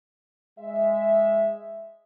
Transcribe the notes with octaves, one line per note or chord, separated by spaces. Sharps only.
G#3 E5